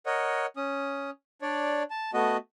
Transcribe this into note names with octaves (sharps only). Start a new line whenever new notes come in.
A#4 C#5 D#5 F#5
C#4 D#6
D4 C#5 D5
A5
A3 B3 F#4 D#5